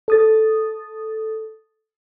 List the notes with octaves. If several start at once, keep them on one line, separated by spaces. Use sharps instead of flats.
A4 D#6 A6